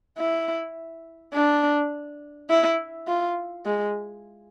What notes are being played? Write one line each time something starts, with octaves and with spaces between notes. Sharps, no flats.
E4
D4
E4
F4
G#3